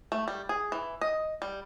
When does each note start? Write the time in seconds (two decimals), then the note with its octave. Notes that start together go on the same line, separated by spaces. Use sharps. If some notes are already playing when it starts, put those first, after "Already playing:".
0.12 A3
0.28 G3
0.49 G#4
0.72 E3
1.01 D#5
1.42 G3